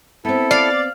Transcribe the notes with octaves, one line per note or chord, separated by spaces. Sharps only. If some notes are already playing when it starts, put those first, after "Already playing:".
B3 C4 E4 A4
D5 F5